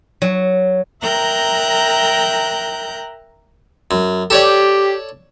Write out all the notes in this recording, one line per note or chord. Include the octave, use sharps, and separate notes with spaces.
F#3
A#4 E5 G5 A#5 F#6 G6
F#2
G4 A4 C#5 D5